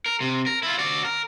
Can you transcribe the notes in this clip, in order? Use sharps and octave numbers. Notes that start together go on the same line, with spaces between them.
A#4
C3
A#4
E4 F4
F#4 D5
A#4